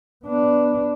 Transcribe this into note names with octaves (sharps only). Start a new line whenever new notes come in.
B3 D4